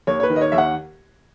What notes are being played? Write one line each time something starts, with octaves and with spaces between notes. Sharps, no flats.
D#2 C#5
C#5
B4
D#3
D#5
C#5
D#2 E5
F#5